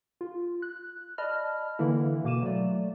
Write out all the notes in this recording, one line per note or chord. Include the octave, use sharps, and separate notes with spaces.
F4
F#6
D5 D#5 A5 B5 F6
D3 E3 A#3 E4
B2 A#3 D6 D#7 E7
F#3 A3 D5